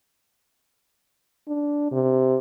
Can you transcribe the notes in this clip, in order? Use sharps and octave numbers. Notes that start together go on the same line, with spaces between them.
D4
C3